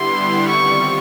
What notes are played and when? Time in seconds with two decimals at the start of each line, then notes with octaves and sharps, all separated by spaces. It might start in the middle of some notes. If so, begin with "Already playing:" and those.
Already playing: D3 G3 B3 E4 G4 C6
0.48 D#3 G3 C4 F4 C#6